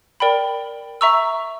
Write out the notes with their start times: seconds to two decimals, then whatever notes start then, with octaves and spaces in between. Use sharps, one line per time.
0.20 A#4 D5 G5 B5
1.01 E5 A#5 C#6 E6